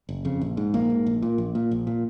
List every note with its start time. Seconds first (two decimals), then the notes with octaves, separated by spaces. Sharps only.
0.09 F#1
0.25 F2 C#3
0.41 A#1
0.57 G#2
0.74 A#1 A#3
0.90 G#2
1.06 A#1
1.22 A#2
1.38 A#1
1.55 A#2
1.71 A#1
1.87 A#2